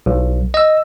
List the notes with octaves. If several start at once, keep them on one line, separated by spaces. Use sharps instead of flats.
B1
D#5 E6